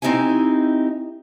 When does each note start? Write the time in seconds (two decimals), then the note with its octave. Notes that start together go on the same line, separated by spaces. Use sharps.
0.02 C4 D#4 E4 G4 G#5